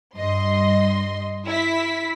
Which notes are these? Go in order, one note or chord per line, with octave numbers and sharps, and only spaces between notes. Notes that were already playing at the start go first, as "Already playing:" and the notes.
G2 D#5 C6
E4 B6